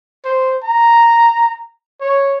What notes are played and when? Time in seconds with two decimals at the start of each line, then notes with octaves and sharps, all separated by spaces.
0.25 C5
0.63 A#5
2.01 C#5